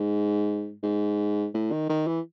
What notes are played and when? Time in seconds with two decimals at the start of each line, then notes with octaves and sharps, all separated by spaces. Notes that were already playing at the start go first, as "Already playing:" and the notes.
Already playing: G#2
0.83 G#2
1.54 A2
1.72 D#3
1.89 D#3
2.07 E3